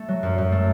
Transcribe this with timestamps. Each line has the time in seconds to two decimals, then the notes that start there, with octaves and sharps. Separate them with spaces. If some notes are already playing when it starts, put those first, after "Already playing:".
Already playing: A3
0.08 F#3
0.23 F#2
0.38 F#2
0.52 A3